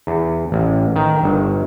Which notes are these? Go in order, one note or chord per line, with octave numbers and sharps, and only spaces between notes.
E2
A1
D#3
G1